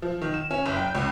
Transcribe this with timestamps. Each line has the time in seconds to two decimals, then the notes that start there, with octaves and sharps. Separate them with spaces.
0.02 F3
0.22 D#3
0.34 E7
0.51 C#4
0.66 F#1
0.77 G5
0.95 C#2